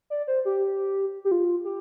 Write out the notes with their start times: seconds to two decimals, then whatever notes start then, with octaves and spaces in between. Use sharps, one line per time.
0.10 D5
0.28 C5
0.45 G4
1.25 G4
1.31 F4
1.65 G4